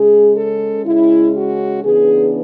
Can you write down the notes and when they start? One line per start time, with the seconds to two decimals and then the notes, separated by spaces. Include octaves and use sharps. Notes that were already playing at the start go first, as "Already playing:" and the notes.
Already playing: C#3 G#3 C#4 G#4
0.36 A4
0.86 C#3 G#3 C#4 E4
1.34 F#4
1.84 C#3 E3 B3 D4 G#4